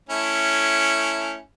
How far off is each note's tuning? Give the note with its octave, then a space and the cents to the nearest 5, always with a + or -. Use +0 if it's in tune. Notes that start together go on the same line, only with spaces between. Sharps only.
A3 +10 C#4 +0 E4 +0